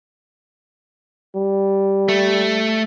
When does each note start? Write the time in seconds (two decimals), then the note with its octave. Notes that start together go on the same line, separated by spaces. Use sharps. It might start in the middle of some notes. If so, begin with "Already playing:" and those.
1.36 G3
2.09 A3